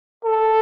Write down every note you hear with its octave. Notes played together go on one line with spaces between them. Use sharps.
A4